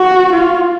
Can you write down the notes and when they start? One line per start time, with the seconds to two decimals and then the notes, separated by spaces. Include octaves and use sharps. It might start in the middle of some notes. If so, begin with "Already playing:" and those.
Already playing: F#4
0.32 F4